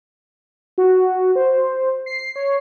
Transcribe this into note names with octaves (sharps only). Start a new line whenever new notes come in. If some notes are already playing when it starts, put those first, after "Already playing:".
F#4
C5
C7
C#5